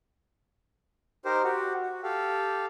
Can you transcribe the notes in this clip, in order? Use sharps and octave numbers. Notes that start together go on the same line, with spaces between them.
D#4 G4 A#4 C5
F#4 G4
F#4
G4 A4 F5